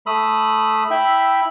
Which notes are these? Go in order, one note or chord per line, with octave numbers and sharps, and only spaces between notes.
A3 B5 D#6 E6
E4 E5 G5 B5